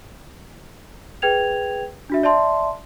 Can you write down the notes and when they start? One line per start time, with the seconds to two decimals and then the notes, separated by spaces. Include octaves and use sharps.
1.22 G#4 B4 G5 G#6 F7
2.10 D4 F#4 E5
2.23 D5 E5 A5 C6